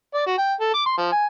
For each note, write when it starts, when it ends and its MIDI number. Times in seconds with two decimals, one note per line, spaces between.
0.15 0.25 74
0.27 0.36 66
0.38 0.53 79
0.61 0.72 69
0.74 0.83 86
0.86 0.97 84
0.98 1.07 53
1.12 1.26 80